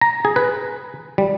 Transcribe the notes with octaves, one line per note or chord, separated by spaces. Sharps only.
A#5
G#4
B4
G3